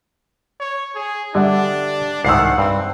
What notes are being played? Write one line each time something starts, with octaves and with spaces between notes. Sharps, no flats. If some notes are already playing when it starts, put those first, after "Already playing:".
C#5
G#4
D3 G3 D4 E5 F#5
C2 G#2 D#3 F#5 E6 C7
G2 C4